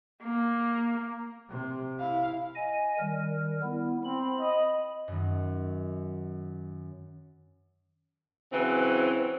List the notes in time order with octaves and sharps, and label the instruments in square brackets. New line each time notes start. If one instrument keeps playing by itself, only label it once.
[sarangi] A#3
[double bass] C3
[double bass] E4 [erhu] F5
[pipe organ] D#5 G#5
D#3 G3 A#4
B3 E4
[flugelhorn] C4 [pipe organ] B5
[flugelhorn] D#5
[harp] F#2 D#3
[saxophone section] C#3 E3 F#3 C4